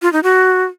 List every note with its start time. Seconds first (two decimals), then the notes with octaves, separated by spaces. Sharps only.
0.02 F4
0.13 D#4
0.23 F#4